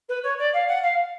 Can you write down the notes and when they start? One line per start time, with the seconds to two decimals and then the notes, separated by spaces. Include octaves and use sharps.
0.09 B4
0.23 C#5
0.38 D5
0.53 F5
0.68 F#5
0.83 F5